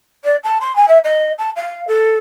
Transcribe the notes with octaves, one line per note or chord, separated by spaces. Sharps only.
D5
A5
C6
G#5
E5
D#5
A5
F5
A4